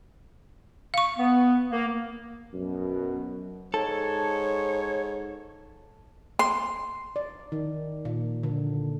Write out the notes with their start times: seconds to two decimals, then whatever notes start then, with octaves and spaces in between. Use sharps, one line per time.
0.94 F5 C#6
1.18 B3
1.70 A#3
2.53 F#2 B2
3.74 G#2 A4 C#5
6.39 C6
7.16 D5
7.52 D#3
8.05 A#2
8.43 D3